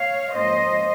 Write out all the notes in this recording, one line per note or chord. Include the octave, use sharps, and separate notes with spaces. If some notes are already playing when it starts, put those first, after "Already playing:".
Already playing: C#5 F5
G#2 F3 A#3 C#4 C5 D#5